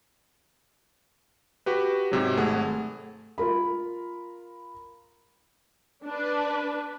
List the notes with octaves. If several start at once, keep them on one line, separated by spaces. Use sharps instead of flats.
F#4 G4 B4
G#2 C3 F#3
G#1 A3 G#4 F#5
F4 A#4 B5
D4 B4